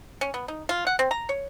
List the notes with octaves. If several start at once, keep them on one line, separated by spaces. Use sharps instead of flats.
C#4
B3
D#4
F4
F#5
C4
A#5
C#5